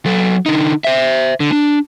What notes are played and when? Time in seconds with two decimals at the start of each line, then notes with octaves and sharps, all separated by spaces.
0.06 F#3 A4
0.46 D3 D#4
0.84 C5 E5
1.40 D3
1.52 D4